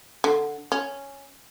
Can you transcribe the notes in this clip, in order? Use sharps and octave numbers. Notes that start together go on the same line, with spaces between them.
D3
C#4